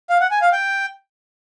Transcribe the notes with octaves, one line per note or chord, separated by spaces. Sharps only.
F5
F#5
G#5
F5
G5